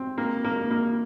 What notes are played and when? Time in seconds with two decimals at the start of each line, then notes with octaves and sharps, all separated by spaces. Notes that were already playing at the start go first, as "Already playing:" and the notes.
Already playing: C4
0.18 A#3
0.44 A#3
0.71 A#3